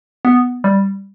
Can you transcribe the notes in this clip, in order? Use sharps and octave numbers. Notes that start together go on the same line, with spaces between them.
B3
G3